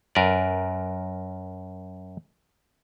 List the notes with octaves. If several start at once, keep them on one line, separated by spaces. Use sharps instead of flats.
F#2 A#4 B4 D5